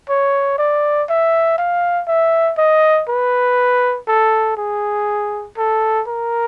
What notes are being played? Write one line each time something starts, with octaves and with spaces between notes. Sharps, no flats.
C#5
D5
E5
F5
E5
D#5
B4
A4
G#4
A4
A#4